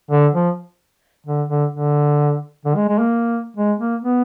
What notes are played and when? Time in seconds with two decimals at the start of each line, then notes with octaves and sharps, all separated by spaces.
0.11 D3
0.34 F3
1.26 D3
1.49 D3
1.72 D3
2.65 D3
2.76 G#3
2.88 G#3
2.99 A#3
3.57 G#3
3.80 A#3
4.03 B3